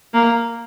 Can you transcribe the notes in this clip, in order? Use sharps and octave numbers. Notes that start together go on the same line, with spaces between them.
A#3